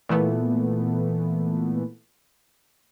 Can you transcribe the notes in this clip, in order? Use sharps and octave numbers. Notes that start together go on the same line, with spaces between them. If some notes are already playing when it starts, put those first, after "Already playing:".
A#2 E3 A3 B3